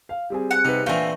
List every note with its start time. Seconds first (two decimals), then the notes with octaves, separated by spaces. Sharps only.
0.09 F5
0.30 G3 C4 G#4
0.51 F#5
0.65 C3 D#4 B4
0.86 A#2 D3 E3 A3 C4 F5 G#5